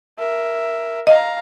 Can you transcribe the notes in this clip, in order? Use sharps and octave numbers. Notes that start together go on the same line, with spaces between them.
A#4 E5
D#5 F5 A#5